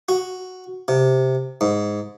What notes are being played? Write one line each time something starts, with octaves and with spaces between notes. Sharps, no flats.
F#4
C3
G#2